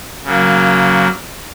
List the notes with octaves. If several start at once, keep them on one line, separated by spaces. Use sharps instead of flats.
C#3 F#3 A#3